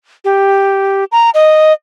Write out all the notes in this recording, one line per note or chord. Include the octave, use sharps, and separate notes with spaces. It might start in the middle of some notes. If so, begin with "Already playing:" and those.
G4
A#5
D#5